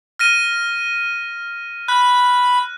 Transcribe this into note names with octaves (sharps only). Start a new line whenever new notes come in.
F6 A#6 D#7
B5 F#6